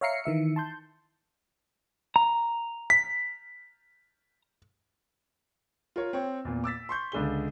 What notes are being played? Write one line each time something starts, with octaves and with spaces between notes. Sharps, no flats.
C#5 E5 F5 A#5 C7 C#7
D#3 E3 E5 C#7
A5 C6 G6
A#5
B6
F4 A#4 C#5
C4 C#5
E2 A#2
D6 E6 A6 B6
C6 C#6 G6
C#2 D3 G#4 G7